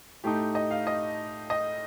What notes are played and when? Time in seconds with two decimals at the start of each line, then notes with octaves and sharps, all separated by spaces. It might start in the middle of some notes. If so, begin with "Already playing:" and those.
0.24 A2 A3 D#4 G4
0.55 D#5
0.71 F5
0.87 D#5
1.50 D#5